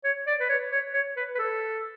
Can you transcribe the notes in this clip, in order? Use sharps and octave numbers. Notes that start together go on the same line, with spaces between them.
C#5
D5
B4
C#5
C#5
C#5
B4
B4
A4